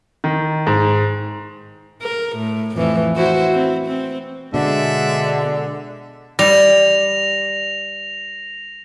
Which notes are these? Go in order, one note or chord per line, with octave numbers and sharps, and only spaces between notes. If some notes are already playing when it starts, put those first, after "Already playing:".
D#3
G#2
A#4
A2
F2 A2 E3
E4 F#4 C5
C4
C4
B2 D3 G#3 D5 E5
G3 A#6 F7